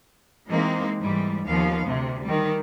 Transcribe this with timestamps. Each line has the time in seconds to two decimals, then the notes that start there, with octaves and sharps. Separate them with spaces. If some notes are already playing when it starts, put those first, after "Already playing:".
0.48 E3 G#3 A#3 C4 D#4
1.00 G#2 E3 G3
1.46 D#2 F3 B3 F5
1.87 D2 C3
2.24 D#3 G3